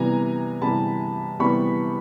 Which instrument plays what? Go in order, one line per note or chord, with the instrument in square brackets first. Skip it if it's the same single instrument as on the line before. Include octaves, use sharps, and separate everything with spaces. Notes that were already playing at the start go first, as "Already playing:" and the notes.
Already playing: [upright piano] C3 E3 G3 B3 G#5 A#5
C3 E3 G3 B3 A5 B5
C3 E3 G3 B3 B5 C#6